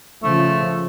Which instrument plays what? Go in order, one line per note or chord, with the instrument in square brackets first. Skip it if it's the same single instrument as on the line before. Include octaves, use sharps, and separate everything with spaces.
[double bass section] C#3 F3 [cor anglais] A3